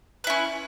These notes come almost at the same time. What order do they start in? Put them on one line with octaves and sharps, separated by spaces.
B4 E4 C#4